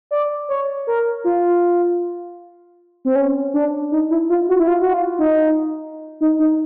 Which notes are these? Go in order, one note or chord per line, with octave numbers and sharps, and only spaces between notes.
D5
C#5
A#4
F4
C4
C#4
D4
D#4
E4
F4
F#4
E4
F4
F#4
F4
D#4
D#4
D#4